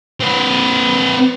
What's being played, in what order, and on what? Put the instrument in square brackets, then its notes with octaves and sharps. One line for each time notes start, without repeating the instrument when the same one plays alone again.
[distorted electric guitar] C4 B4